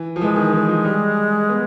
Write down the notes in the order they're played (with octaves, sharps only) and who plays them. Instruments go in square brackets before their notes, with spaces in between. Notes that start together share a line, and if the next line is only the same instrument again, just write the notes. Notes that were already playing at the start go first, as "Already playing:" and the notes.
Already playing: [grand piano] E3
F3
[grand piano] E3 [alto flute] G#3
[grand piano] D#3
E3
F3
G3
B3